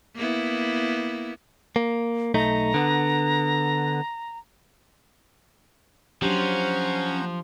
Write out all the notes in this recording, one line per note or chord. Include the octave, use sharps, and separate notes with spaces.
A#3 B3 E4
A#3
B1 A3 D#4 A#5
D3 B3
F3 F#3 C#4 D4 G4 C5 F#5 A#5